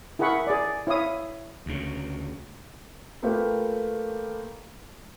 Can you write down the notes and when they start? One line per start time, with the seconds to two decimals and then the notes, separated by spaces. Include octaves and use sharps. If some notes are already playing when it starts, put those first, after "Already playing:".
0.19 E4 G#4 A#4 F#5 B5 C#6
0.47 G#4 D5
0.87 E4 C#5 F5 D#6
1.66 D2 C#3
3.23 A3 A#3 F4 G4 B4 F5